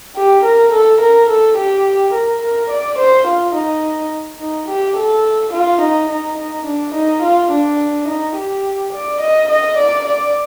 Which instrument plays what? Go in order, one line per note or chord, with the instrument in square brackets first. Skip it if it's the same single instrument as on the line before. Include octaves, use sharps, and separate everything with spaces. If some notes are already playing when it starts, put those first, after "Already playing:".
[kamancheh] G4
A#4
A4
A#4
A4
G4
A#4
A#4
D5
C5
F4
D#4
D#4
G4
A4
F4
D#4
D#4
D#4
D4
D#4
F4
D4
D#4
G4
D5
D#5
D#5
D5
D5